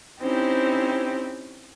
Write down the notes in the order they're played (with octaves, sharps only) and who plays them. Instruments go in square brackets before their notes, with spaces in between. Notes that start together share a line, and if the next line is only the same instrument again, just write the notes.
[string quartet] C4 C#4 D#4 E4 G4 C5